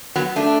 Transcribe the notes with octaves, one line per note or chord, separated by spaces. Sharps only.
F#3 B3
A3 D4